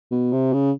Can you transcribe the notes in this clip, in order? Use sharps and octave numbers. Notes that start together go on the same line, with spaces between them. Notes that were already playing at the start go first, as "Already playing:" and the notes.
B2
C3
C#3